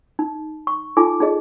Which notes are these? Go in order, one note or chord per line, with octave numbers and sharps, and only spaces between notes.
D#4
C#6
D#4 F4 A4 G#5 D6
D#4 G#4 D#5